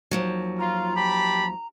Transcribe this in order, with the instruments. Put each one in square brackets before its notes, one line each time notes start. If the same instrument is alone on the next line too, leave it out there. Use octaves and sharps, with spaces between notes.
[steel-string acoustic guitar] D#2 F3 F#3
[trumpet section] F4 [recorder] A#5
[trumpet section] G4 A5 B5